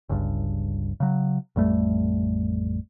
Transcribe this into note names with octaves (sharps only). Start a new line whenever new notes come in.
G1 C#2 G2
C#3 F#3
A1 F2 G3 A3